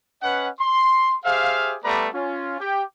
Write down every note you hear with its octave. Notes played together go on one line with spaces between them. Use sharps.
C#4 B4 D#5 F#5
C6
G4 G#4 C5 E5 F5
G3 A3 B3 B4 D5 A#5
C#4 F4
G4 G5